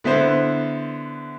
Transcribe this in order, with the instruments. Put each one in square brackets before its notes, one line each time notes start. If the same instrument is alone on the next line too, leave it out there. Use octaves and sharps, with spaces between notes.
[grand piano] D3 B3 E4 C5